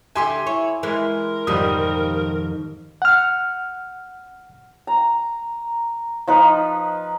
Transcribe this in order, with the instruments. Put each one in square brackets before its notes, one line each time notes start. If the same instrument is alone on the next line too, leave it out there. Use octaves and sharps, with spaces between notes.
[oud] D3 G4 E5 [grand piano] G#5 C6 D6
[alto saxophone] E4 [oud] C#5
[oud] E3 G#3 [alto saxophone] A#4
[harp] F2 G#2 D#3 [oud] B2 F3 G4 [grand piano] G3 D#6
[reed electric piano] F#5 F6
[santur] A#5
F3 D#4 B4